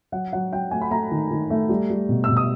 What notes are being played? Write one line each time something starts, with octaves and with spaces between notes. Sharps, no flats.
F#3 F#5
F#3 F#5
F#3 G5
A3 G#5
B5
A3 A#5
D#3
D#3
A3
G3
G3
B2
B2 E6
D#6